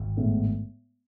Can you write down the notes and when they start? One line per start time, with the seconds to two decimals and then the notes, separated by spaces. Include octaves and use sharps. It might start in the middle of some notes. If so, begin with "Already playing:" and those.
Already playing: G#1 G#2
0.17 A2 G#3 B3